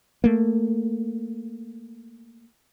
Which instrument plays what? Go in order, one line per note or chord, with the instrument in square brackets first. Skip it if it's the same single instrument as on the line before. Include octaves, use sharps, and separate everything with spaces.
[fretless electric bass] A3 A#3